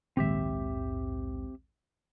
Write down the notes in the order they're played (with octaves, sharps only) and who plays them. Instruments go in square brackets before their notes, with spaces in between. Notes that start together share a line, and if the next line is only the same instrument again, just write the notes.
[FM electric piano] A#1 D#2 G#2 [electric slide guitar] C4 G4 E5